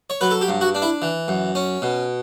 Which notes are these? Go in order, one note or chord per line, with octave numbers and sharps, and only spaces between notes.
C#5
F#3 B4
A4
G4
G2
F#4
D4
E4
E3
F#2
C#4
B2